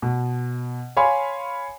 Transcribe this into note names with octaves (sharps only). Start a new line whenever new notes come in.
B2
C#5 F5 G#5 B5 C6